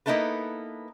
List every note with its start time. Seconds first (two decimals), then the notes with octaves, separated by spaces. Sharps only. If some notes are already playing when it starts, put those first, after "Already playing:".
0.06 A#3 B3 D#4 E4 A4 B4